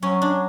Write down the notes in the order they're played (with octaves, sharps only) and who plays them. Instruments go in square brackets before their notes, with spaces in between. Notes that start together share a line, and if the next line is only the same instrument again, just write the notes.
[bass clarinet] F#3 [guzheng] C#4
[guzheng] D4